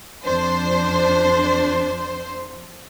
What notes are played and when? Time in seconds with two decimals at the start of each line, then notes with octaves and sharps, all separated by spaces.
0.24 F2 D4 C5